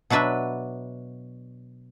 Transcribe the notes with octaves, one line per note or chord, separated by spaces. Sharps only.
B2 F#3 D4 B4 E5